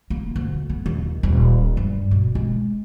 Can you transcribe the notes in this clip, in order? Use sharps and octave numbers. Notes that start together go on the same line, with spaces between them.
A#3
D2
B3
D#2
D#1
G2
B2
G#3